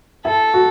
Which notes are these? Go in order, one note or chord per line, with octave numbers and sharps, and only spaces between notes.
E4 A4
F#4